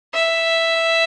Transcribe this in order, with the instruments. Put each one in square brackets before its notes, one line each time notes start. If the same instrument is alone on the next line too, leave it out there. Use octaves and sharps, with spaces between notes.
[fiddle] E5